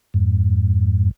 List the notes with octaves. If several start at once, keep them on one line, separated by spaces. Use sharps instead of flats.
F2 G#2